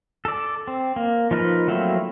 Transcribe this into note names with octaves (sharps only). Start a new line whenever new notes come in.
A4 D5
C4
A#3
F3 D#4 A#4 B4
F#3 A3 A#3 C4 E4